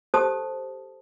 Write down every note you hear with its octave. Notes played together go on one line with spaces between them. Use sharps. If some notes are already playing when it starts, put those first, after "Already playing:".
G4 A4 C5 A5 D#6